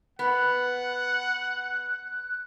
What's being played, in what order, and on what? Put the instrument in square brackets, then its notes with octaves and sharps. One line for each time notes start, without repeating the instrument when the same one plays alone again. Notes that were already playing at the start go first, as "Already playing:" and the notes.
[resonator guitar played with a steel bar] B3 [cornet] F#5 [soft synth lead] F#6